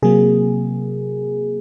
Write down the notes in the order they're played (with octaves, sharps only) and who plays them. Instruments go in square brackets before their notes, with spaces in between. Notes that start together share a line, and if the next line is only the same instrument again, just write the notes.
[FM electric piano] C3 F#3 A#3 G#4